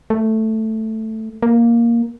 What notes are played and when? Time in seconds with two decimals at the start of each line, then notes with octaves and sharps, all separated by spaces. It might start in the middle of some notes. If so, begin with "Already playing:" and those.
0.10 A3
1.42 A#3